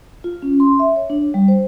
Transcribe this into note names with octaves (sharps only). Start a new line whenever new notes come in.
F4
C#4
C6
E5
C#5
D4
G3
C5